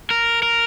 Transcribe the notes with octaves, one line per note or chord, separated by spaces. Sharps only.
A#4
A#4